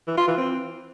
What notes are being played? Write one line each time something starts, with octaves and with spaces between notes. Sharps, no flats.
E3
F4
E3
C4